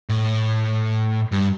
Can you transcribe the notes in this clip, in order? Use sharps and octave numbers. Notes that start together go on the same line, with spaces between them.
A2
G2